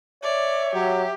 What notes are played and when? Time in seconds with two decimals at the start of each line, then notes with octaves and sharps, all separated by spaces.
0.23 C#5 D5 E5
0.74 F#3 G4